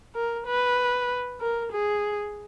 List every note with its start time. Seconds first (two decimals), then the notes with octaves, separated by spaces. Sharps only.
0.15 A#4
0.46 B4
1.41 A#4
1.72 G#4